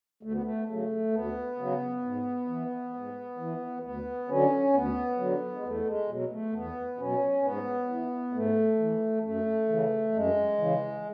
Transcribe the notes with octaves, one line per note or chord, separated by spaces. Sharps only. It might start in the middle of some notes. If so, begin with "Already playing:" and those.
D2 A3
B3
A3
C#3 F#3 A3
D2 B3
C#3 F#3
G#2
E3
G#2
E3
D2 B3
D3 F#3 C#4
D2 B3
D3 F#3
G#3
E2 A3
G#3
B2 F#3
A3
E2 B3
B2 F#3 C#4
G#2 B3
E3
G#2 A3
E3
F#2 A3
C#3 E3
F#2 G#3
C#3 E3